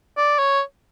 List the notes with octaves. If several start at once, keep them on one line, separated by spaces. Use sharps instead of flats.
D5
C#5